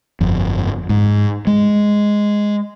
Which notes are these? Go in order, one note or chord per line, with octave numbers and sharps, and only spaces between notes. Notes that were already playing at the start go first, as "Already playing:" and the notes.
G1 F2
G#2
G#3